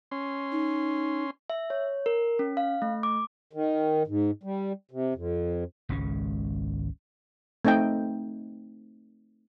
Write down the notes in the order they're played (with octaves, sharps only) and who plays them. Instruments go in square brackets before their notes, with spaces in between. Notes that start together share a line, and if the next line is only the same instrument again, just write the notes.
[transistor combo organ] C#4 C6
[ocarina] D#4
[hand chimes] E5
C#5
A#4
C#4
F5
A3
D6
[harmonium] D#3
G#2
G3
C3
F2
[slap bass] G#1 C#2 G#3 C#4
[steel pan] A3 C4 D#4 D#5 G5